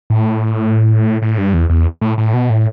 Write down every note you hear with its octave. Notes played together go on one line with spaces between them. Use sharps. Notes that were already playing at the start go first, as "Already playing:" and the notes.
A2
A2
G2
E2
E2
A2
A2
B2
A2